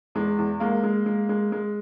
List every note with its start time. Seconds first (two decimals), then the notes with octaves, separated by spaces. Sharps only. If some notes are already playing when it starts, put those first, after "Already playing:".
0.15 E2 G#3
0.39 E2
0.60 G#3 A#3
0.83 G#3
1.06 G#3
1.29 G#3
1.52 G#3